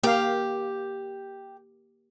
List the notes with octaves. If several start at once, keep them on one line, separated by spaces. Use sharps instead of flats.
A#3 G4 F5